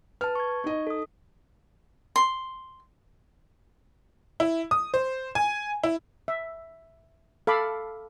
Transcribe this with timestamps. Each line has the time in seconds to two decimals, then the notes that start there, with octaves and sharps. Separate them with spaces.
0.21 B4 A5 F6
0.35 C#6 G#6
0.64 D#4 D#5
0.87 A4 D#6
2.16 C6
4.40 E4
4.71 D#6
4.94 C5
5.35 G#5
5.84 E4
6.28 E5
7.47 A4 F5 B5 D6